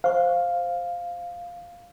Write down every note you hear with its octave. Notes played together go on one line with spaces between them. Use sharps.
C5 F5 C#6